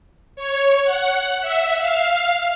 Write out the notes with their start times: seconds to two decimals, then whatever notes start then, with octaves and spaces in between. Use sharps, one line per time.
0.36 C#5
0.84 F#5
1.41 E5
1.78 F5